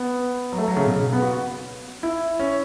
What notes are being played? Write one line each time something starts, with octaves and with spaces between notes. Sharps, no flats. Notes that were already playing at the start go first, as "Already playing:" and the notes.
Already playing: B3
F#3
A3
F#3
C#3
B2
C#3
B3
F#4
E4
C#4